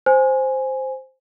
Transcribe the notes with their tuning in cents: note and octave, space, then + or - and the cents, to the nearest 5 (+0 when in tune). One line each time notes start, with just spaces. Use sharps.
C5 +0 G#5 +0